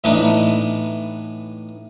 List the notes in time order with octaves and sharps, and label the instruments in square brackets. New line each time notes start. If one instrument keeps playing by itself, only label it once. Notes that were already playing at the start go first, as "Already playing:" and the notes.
[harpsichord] A2 E3 B3 D4 D#4